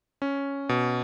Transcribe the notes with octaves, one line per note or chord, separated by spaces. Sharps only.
C#4
B2